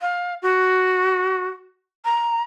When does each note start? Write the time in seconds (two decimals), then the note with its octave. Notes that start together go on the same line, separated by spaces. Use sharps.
0.01 F5
0.42 F#4
2.05 A#5